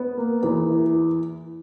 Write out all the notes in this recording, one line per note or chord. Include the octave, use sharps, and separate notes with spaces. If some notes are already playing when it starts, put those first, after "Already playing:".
Already playing: B3
A#3
E2
E3